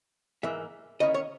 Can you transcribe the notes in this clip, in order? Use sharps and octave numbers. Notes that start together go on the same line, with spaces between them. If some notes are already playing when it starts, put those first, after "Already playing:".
G#2 E3 A#3 E5
D#3 A#3 C#4 E4 D#5
C#5